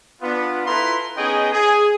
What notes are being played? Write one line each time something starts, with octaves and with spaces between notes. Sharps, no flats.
B3 D4 F4
E4 F4 A4 B4 A#5 C6
B3 C#4 D#4 G#4 D#5 G5
G#4